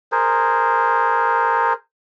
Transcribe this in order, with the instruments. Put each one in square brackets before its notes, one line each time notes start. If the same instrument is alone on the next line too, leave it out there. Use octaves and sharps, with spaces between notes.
[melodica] G#4 A#4 C5